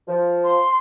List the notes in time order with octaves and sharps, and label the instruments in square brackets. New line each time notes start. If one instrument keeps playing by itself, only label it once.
[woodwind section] F3
[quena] C6